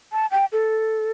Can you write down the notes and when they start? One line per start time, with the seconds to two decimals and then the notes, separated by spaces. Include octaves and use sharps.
0.12 A5
0.31 G5
0.52 A4